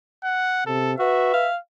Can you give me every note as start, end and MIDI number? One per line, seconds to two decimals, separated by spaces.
0.24 0.66 78
0.67 0.96 48
0.67 0.93 69
0.99 1.30 66
0.99 1.47 71
0.99 1.51 76
1.34 1.57 77